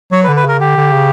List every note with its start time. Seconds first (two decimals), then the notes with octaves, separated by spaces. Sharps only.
0.12 F#3 C#5
0.23 B4
0.28 D3
0.36 B4
0.45 C#3 A#4
0.60 D3 G4
0.77 D3
0.93 C#3